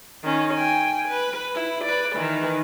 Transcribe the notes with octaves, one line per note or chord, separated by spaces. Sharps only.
D#3 C#4
G5 G#5
B4
E4
B4 D5
D#3 E3